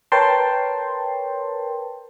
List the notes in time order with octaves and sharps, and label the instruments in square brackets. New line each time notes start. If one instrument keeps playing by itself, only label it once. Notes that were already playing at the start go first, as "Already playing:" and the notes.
[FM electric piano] A#4 B4 C#5 G5 A5 C6